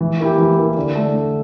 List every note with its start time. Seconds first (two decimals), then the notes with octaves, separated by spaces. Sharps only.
0.01 E3
0.20 A#3 E4 G4
0.38 E3
0.57 A#3 E4 G4
0.76 D3
0.95 A3 D4
1.13 D3